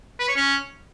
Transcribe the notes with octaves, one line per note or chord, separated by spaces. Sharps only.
B4
C#5
C#4